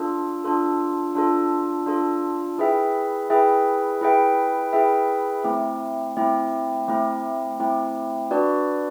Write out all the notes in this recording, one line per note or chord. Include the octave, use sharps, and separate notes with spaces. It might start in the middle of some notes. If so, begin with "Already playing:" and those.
Already playing: D4 F4 A4
D4 F4 A4
D4 F4 A4
D4 F4 A4
E4 G#4 B4 E5 G5
E4 G#4 B4 E5 G5
E4 G#4 B4 E5 G5
E4 G#4 B4 E5 G5
A3 C4 E4
A3 C4 E4
A3 C4 E4
A3 C4 E4
D4 F#4 B4 D5